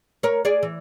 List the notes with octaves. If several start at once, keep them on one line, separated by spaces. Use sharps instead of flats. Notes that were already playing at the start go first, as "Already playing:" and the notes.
A#4 C#5
G#4 D5
E3